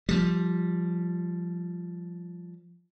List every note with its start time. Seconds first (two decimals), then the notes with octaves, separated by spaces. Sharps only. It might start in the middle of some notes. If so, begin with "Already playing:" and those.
0.09 F3 G3